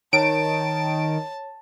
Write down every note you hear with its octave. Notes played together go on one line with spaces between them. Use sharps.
D#3 C#5 A5 D7